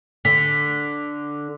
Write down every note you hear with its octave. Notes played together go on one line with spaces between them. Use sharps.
D3 B6